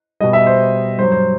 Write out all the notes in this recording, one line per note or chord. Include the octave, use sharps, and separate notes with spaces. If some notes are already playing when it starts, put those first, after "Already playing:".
B2 G3 D#5
E5
C5
G2 F#3 C5
C5